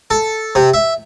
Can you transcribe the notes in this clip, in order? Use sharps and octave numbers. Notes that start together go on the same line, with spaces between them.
A4
C3
E5